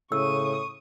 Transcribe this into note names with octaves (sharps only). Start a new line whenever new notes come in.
A2 C#3 C#6 D#6 E6